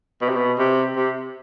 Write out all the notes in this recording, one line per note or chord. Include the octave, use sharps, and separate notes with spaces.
B2
C3
B2
C3
C3